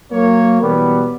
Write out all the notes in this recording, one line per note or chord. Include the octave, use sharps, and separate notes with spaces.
F#3 A#3 C#5
B2 E3 F#3 G3 B3